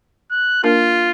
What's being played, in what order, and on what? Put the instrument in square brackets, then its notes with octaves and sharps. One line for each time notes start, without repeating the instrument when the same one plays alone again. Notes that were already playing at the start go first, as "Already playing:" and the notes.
[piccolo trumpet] F#6
[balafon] A#3 D4 A#4 [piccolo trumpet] F4